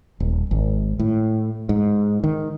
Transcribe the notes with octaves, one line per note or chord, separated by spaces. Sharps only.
D#1
G#1
A2
G#2
D#3